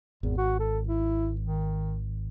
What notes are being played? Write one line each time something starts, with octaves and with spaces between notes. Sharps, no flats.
G#1 E2
F#4
A4
E4
D#3